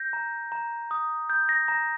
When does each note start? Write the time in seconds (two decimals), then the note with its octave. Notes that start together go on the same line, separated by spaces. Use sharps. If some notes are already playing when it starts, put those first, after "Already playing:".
Already playing: G6 A#6
0.13 A#5
0.52 A#5
0.91 D#6
1.30 G6
1.49 A#6
1.68 A#5 A#6